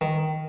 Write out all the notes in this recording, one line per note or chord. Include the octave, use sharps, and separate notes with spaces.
D#3